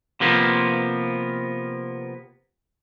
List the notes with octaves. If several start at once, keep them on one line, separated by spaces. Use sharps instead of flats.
C3 F3 A#3 B3